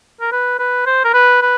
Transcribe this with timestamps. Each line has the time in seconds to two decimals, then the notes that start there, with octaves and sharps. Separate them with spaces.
0.21 A#4
0.32 B4
0.59 B4
0.86 C5
1.05 A#4
1.14 B4
1.42 B4